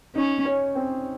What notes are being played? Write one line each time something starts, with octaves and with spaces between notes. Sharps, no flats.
C#4 D#4
C#4
C4